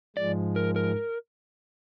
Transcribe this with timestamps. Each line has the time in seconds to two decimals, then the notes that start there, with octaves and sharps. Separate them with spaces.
0.17 G#2 F3 G#3 D5
0.56 A#4
0.76 A#4